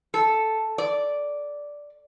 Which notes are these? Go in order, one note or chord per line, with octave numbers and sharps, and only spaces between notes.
A4
D5